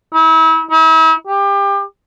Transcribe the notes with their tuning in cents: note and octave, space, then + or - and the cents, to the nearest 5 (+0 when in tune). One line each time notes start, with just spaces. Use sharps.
E4 -35
E4 -40
G4 +25